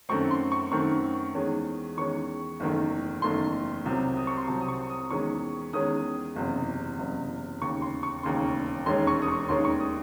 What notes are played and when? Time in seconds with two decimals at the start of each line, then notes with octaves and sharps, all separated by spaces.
0.09 F#2 D#3 A3 C4 C#6
0.31 C6
0.52 C#6
0.72 F#2 D#3 A3 C4 C#6
1.35 E2 D#3 G#3 C#4
1.97 E2 D#3 G#3 C#4 C#6
2.60 F#1 E2 D#3 A3
3.22 F#1 E2 D#3 A3 C6
3.85 C2 C3 F#3 C4
4.17 D#6
4.27 C#6
4.37 C6
4.48 C2 C3 F#3 C4 A5
4.61 D#6
4.68 C#6
4.90 D#6
5.10 E2 D#3 G#3 C#4 C#6
5.73 E2 D#3 G#3 C#4 D#6
6.36 F#1 E2 C3
6.98 F#1 E2 C3
7.61 E1 D#2 C#3 C#6
7.82 C6
8.03 C#6
8.23 E1 D#2 C#3 C6
8.86 E1 D#2 D#3 G#3 C#4 C6
9.07 C#6
9.22 D#6
9.28 C#6
9.49 E1 D#2 D#3 G#3 C#4 C6
9.65 C#6
9.80 D#6